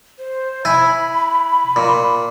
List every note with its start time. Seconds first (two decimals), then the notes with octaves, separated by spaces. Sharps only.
0.19 C5
0.65 E4 G#5 B5
1.76 A#2